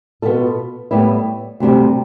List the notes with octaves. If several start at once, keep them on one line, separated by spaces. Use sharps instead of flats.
B2 B3 F4 A4
A2 G3 B3 E4
D2 C3 G3